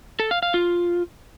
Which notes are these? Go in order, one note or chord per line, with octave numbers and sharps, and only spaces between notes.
A4
F5
F5
F4